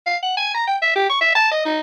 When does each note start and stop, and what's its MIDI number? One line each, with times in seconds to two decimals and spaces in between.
0.06 0.17 77
0.23 0.37 78
0.37 0.50 80
0.54 0.64 82
0.67 0.76 79
0.82 0.92 76
0.96 1.07 67
1.10 1.19 85
1.21 1.31 76
1.35 1.51 81
1.51 1.61 75
1.65 1.80 63